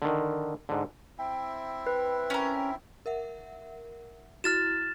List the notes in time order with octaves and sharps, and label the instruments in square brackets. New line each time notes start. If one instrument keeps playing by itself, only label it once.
[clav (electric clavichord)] D3 D#3
G#2 D3
[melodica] C4 E4 E5 [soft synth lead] G5
[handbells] B4
[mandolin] C#4 A#4
[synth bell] A#4 E5 F#5
[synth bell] E4 F#4 [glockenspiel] F6 A6 E7